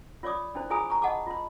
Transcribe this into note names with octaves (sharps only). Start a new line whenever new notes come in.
F4 C#5 D5 D6 D#6
D4 E4 C5
F4 G#4 G#5 A#5 B5 D#6
A#5 C#6
D#5 F#5 A5 D6
F4 C6